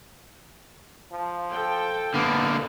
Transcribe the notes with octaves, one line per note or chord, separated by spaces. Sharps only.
F3
A4 G5
D3 A#3 B3